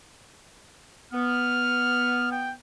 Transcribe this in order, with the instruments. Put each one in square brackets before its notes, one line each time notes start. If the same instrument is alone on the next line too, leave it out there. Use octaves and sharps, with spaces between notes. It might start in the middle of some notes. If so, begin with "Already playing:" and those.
[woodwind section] B3 [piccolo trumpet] F6
[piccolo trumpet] G5